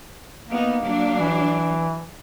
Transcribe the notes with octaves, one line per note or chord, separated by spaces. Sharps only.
A#3 B3 D#4
F#3 D4
E3